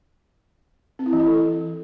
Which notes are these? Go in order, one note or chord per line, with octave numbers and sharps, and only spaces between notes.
C4
E4
E3
E4
A4